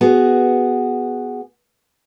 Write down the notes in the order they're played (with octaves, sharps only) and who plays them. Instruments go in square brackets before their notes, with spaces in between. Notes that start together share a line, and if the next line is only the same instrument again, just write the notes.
[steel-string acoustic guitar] B3 F#4 G#4